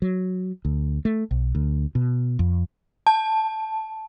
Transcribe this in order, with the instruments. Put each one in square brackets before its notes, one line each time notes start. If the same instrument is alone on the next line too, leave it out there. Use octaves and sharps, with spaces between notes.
[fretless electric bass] F#3
D2
A3
B1
D2
B2
F2
[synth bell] A5